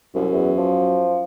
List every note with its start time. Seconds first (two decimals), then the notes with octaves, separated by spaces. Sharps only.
0.15 C2 F#2
0.32 E2
0.57 F3